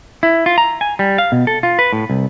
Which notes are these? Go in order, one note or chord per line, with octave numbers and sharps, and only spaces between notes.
E4
F4
A#5
G#5
G3
F5
B2
A4
F4
B4
A2
C2